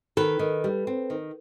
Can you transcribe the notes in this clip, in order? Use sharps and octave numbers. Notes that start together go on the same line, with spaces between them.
D#3 A4 B4
D#3
G3
C4
D#3